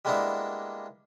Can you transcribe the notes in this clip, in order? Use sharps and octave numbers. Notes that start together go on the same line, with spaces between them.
G3 G#3 A#3 B3 D4 E4